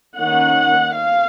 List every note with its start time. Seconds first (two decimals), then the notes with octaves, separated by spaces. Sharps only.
0.18 D#3 A#3 C#4 F#5
0.96 F5